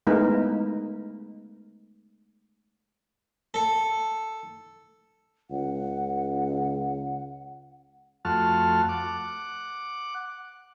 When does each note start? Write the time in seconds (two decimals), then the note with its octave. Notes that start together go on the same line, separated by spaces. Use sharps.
0.07 G#3 A3 B3 D#4 E4 A#4
3.54 A4
5.51 C#2 F#5
8.25 F2 A3 F#4 A5 F6
8.89 F#5 D6